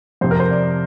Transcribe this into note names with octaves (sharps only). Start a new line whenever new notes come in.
F2 C3 F3 C4 C5
A#4
C5
D5